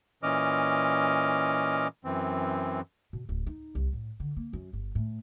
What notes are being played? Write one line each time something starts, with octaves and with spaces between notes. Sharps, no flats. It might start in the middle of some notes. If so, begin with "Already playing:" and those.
A#2 E3 C#4 D#5 D6 F6
F#2 E3 C4
B2
D1
D#4
C2
A2
D3
A#3
F#2
G1
A2